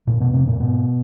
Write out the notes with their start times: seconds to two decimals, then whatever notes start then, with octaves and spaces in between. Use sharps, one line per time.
0.07 F2 A#2 A#3
0.20 B2 B3
0.33 F2 C3 C4
0.47 A#2 A#3
0.59 G#2 B2 B3